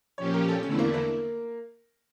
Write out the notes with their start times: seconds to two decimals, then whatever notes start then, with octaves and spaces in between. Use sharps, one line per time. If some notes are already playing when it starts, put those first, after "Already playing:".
0.18 A#2 F3 C#4 G4 C#5
0.34 A#4
0.48 A4
0.63 E2 D3 A3 C#4 E4
0.79 A#3
0.94 A#3